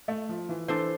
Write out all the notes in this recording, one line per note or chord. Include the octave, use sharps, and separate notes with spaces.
A3
F3
E3
E3 D4 A4 C5